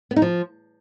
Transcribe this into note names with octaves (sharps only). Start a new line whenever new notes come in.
B3
D#4
F3